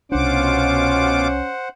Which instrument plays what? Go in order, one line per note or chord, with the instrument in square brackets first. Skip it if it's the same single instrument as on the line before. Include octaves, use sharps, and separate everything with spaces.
[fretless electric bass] C2 D4 [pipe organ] B2 F4 D6 [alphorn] C#4 [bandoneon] C5 F#5